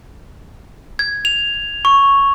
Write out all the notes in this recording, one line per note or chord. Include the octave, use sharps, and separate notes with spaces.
G#6
F7
C#6